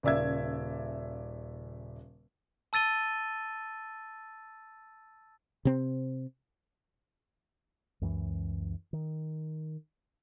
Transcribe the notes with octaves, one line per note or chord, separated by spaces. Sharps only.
D#1 C#3 D5 E5 E6 G#6
A5 E6 A6 D#7 G7
C3 C4
C#2 F#2 E3
D#3